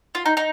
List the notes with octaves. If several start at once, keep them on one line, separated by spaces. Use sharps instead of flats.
F4
D#4
D#4